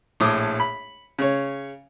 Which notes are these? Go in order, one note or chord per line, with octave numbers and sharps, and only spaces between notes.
A#1 A2 D6 D#6
B5
C#3 C#5